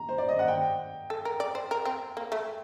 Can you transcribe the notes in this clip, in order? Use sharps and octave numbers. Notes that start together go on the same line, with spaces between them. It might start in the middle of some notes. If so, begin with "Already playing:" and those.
Already playing: A#5
C5
D5
D#5
F#5
G5
A4
A#4
D5
C5
A#4
C4
A#3
A3